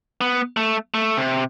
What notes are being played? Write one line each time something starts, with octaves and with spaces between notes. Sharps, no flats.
B3
A3
A3
C3